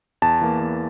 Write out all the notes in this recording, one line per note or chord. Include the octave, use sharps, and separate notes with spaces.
E2 A5
E3 A#3
E2